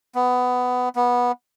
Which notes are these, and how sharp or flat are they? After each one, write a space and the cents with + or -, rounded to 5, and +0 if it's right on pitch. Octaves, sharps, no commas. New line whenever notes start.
B3 +15
B3 -15